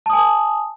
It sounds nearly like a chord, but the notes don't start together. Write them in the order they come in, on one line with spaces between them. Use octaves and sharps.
A5 D#6 G#5